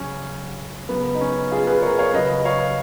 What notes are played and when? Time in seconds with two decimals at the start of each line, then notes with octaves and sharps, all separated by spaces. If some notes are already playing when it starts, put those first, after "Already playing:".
Already playing: C#3 F#3 C#4
0.89 C#3 F#3 B3
1.15 D#4
1.21 C#4
1.52 F4 G#4
1.67 G#4 B4
1.82 A#4 C#5
1.99 C#5 F5
2.13 C#3 F#3 B4 D#5
2.45 C#5 F5